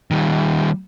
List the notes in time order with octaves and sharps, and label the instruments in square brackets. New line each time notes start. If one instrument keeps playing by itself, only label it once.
[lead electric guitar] D#3 G3